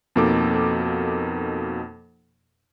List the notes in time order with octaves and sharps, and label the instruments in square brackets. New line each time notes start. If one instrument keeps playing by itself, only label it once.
[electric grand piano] F2 B2 A#3 D#4 A4 D6